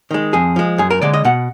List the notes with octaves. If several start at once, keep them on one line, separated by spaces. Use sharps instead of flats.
D#3 G#3
F2 G#4
F3 G#3
F#2 G#4
A#4
D3 G#3 D5
D#5
B2 F#5